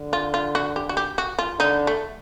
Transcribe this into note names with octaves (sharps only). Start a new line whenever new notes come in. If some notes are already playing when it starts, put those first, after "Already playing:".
Already playing: D3
F4
F4
F#4
G4
F#4
G4
F#4
F4
D3 D#4
A3